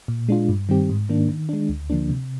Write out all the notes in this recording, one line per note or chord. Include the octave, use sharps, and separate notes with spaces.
A#2
G#3 D4 F4
G2
D#3 G3 C4 G4
G#2
D#3 A#3 D4
D#3
G#3 D4
D2
D3 F3 A#3 D4
C3